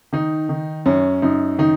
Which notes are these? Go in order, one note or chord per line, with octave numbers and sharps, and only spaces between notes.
D#3 D#4
D#3
F#2 C#4
F#2 D#4
D#3 D#4